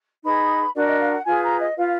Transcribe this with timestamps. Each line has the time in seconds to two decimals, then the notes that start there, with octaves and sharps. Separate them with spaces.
0.24 D#4 G#4 B4 B5
0.75 D4 F#4 A#4 D5
0.87 D#5
1.00 F5
1.13 F#5
1.25 F4 G#4 B4 G#5
1.42 A#5
1.59 D#5
1.76 F4 B4 F5